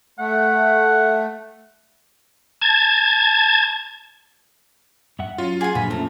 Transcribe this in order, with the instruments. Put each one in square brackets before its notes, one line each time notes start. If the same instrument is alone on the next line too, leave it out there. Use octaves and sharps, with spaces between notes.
[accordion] A3 [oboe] F#5
[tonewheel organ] A5 G#6
[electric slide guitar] G2 E5 F#5
[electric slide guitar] F#3 C#4 [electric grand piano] F4
[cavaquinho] G#4 F#5 G#5
[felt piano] D2 G2 [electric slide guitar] A#2 F3 F#3 [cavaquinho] B5
[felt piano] F#2 A#2 F3 [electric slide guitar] A3 [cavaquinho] A5 A#5